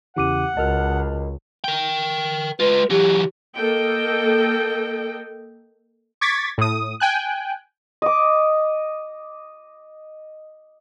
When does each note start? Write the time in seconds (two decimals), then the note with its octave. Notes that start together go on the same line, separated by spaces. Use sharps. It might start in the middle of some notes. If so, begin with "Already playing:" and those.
0.16 E2 C#3 E3 G4 F#5 D6 D#7
0.57 C#2 F#4 A#4 D#5 A5 F6 F#6
1.64 A#4 G5
2.60 G#3 F4 B4
2.90 E3 F#3 G4
3.56 A#3 A4 D#5 G5
6.21 C#6 D6 G#6 A6 B6
6.58 A2 D#6
7.00 G5 G#5 F#6
8.02 D#5 D6